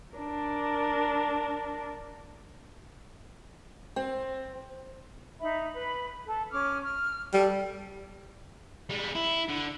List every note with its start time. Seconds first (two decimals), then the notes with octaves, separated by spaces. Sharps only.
0.16 D4 A#4
3.96 C4
5.40 D#4 E5 B5
5.74 B4 B5
6.27 A4
6.52 C#4 D6 F6
6.84 F6
7.33 G3 A4
8.90 G3 G#3
9.15 E4
9.49 D3